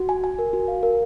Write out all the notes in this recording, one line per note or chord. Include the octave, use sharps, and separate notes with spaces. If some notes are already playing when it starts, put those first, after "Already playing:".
Already playing: F#4
G#5
G#5
A#4
F#4
F5
A#4